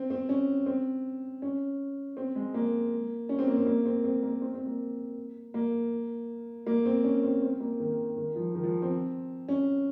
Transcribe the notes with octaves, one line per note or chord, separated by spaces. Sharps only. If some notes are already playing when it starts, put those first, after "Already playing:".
Already playing: C4
C4
C#4
C4
C#4
C4
G#3
A#3
C#4
C4
A#3
C4
A#3
C4
C4
A#3
C4
C4
A#3
A#3
A#3
C4
C#4
C4
C4
A#3
D#3
D#3
F3
D#3
F3
C4
C#4